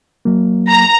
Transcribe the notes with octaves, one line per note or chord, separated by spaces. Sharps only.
F#3 A#3
A#5